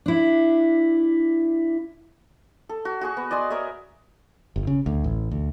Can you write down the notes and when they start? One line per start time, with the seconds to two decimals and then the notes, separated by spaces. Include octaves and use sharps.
0.06 D4 E4
2.69 A4
2.85 F#4
3.01 F#4 G#4 C#6
3.17 B3
3.31 D5 D#5 G#5 C6
3.50 A#4 C#5 D#5 E5
4.56 G1
4.67 C#3
4.86 D2
5.04 A1
5.31 D2